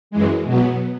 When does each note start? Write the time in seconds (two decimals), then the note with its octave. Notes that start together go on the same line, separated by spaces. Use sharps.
0.11 F#2 E3 G#3
0.45 B2 F#3 B3